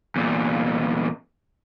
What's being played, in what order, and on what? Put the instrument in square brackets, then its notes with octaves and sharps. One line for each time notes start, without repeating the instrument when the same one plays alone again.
[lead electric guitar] E2 A#2